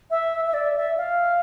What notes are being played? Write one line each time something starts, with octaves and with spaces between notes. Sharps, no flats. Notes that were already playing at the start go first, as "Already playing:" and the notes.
E5
E5
D5
E5
F5